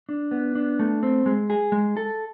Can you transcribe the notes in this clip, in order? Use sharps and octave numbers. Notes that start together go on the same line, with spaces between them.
D4
B3
D4
A3
C4
G#3
G#4
G#3
A4